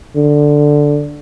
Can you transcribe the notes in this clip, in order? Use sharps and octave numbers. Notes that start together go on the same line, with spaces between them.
D3